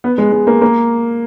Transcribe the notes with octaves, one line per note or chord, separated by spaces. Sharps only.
B3
G#3
G#3
A#3
A#3